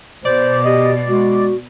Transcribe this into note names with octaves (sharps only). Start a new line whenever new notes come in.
B2 C5 D5
G4 D#5
G#3 F#4